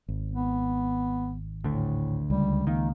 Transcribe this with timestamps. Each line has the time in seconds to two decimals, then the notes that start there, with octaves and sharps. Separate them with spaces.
0.08 G#1
0.31 B3
1.64 D2 A2 D3
2.30 C#2 G3
2.67 D#3 A#3